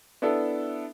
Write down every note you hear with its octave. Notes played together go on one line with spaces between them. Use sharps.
B3 D4 E4 A4